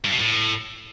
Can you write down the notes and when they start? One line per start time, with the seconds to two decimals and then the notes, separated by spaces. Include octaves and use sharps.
0.04 G2
0.12 B2
0.19 A2